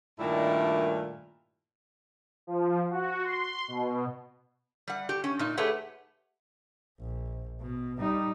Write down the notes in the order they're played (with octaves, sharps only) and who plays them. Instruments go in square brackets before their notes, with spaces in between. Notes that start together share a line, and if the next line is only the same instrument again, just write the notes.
[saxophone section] G2 A#2 D#3 G3 A3 E4
[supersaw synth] F3
F#4
C6
B2
[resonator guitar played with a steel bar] G3 F#5
G4
C#4
A#2 D#4
A3 G4 G#4 B4 C#5 F#5
[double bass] A#1
B2
G3 D#4